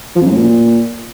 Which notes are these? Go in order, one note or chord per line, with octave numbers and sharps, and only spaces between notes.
F3
F2
F#2
A2
A#2